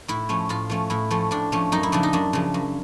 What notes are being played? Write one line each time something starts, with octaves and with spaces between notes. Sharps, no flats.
A2 E4
F3 A3 C#4
A2 F4
F3 A3 C#4
A2 E4
F3 A3 C#4
A2 D4
F3 A3 C#4
F#2 D#4
E4
C#3 F3 D4
D#4
F#2 D4
C#3 F3
F#2